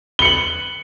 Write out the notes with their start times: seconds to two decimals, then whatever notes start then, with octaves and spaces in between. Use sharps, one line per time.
0.19 G7
0.22 C#7
0.25 F#7